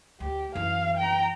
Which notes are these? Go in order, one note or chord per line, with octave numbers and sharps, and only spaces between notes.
D2 G4
F#2 E3 F5
G5 A#5